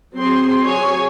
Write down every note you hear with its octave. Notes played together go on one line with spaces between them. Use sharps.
F#3 C4 G#4 C6
F#3 G#4 C#5 G#5